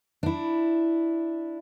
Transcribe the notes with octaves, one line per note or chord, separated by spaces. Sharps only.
D4 E4